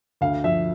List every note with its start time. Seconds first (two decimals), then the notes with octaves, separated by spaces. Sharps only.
0.21 D2 F5
0.44 F3 E5